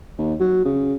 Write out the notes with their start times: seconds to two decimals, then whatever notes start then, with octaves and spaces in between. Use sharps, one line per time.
0.18 D#2
0.40 F#3
0.65 C#3